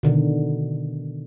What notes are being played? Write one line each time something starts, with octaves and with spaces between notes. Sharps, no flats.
B2 D3 D#3